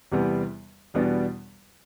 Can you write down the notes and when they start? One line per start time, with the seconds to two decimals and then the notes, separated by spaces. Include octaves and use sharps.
0.12 E2 C3 G3 B3
0.94 E2 B2 G3 B3 D4